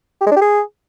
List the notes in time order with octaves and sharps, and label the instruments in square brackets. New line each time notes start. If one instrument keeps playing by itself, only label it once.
[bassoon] G4
G#3
D4
G4
G#4